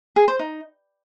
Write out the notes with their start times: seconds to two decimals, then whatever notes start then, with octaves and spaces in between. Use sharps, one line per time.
0.16 G#4
0.28 C5
0.39 D#4